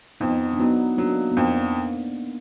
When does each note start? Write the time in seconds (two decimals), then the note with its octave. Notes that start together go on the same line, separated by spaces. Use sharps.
0.20 F2 B3 D#4
0.53 D4
0.59 F#3 B3 D#4
0.98 F#3 A#3 D4
1.31 B3
1.37 F2 A#3 D4